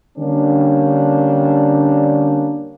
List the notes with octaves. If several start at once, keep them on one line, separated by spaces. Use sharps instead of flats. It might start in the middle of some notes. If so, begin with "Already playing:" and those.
D3 G3 A#3 C#4 D4